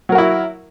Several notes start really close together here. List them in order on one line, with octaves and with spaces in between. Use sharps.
F#3 A#4 F#4 E4